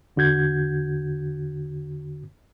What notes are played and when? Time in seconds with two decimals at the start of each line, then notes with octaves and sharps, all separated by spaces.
0.16 E2 D3 F#4 G6 G#6